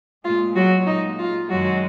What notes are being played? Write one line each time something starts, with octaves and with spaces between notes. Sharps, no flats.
A#2 G#3 F4
F#3 F#4
A#2 G#3 D#4
F4
F#2 D#3 F#3 G#3 F#4